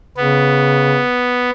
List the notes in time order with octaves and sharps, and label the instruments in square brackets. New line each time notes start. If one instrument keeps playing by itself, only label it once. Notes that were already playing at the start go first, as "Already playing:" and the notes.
[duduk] C#3 [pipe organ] B3